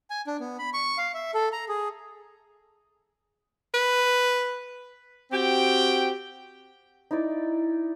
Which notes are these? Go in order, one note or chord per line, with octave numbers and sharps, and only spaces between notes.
G#5
D4
B3
B5
C#6
F5
E5
A4
A#5
G#4
B4
C4 F#4 G4 G5
D#4 E4 D5